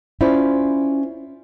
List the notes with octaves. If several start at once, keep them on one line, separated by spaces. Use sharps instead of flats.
C#4 E4 F4 C5 D5